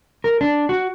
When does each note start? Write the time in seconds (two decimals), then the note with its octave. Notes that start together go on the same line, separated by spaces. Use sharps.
0.24 A#4
0.41 D4
0.69 F#4